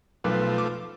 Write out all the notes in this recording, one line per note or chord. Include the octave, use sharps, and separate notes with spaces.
B1 F3 A3 B4 D6
D6